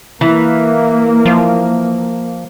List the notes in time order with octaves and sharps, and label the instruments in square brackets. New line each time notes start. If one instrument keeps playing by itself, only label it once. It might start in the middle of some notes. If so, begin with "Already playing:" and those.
[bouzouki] E3 [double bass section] A#3
[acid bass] F3